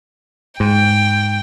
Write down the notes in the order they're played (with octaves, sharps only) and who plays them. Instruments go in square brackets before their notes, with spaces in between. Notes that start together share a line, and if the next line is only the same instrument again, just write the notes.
[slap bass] G#2 [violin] G5